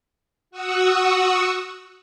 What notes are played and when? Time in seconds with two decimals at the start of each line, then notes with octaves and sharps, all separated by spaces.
0.51 F#4 F#5 C#6 D#6 E6